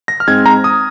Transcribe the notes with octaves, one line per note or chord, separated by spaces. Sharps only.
A#6
F6
G#2 G#3 C4 G#6
A#5
D#6